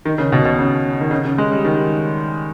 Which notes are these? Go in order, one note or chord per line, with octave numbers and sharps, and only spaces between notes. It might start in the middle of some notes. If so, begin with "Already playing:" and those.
D#3
C#3
B2
B2
C#3
D#3
C#3
C#3
G#3
G3
D#3